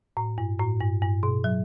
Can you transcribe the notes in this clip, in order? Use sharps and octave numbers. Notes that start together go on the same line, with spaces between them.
A2
G2
A2
G2
G2
B2
F#3